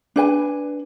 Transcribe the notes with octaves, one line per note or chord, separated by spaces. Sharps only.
D4 B4 G#5